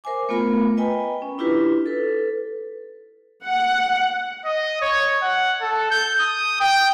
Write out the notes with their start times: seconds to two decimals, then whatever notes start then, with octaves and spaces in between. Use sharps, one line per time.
0.04 A#4 C5 E5 G#5 D6
0.29 A3 B3 F4 A#4 B5
0.77 B4 D#5 G5 G#5 A#5 B5
1.22 C#4
1.38 D4 E4 F4 G4 B4
1.86 A4 B4
3.47 F#5
4.45 D#5
4.82 C#5
5.22 F#5
5.61 A4
5.91 G6
6.20 D#6
6.61 G5